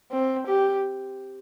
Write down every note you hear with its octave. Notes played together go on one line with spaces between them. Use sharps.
C4
G4